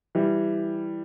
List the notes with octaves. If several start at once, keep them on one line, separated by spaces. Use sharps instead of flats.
E3 G3